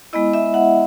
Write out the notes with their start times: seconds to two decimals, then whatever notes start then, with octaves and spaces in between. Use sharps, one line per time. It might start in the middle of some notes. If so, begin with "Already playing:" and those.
0.13 G#3 B3 E4 D#5
0.33 E5
0.54 F#5